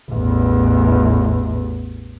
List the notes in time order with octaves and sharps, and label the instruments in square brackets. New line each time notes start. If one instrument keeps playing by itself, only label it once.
[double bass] A1 E2